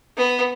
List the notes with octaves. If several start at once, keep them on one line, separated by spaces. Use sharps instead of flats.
B3